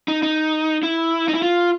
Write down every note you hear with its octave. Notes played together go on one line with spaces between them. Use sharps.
D#4
D#4
E4
D#4
E4
F4